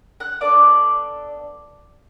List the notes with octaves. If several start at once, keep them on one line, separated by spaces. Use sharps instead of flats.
F#5 F#6
B3 D4 A4 D5 D6